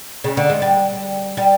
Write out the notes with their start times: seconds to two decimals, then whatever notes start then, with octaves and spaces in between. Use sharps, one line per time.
0.24 C#3
0.37 D3
0.50 G#3
0.62 G3
1.37 G3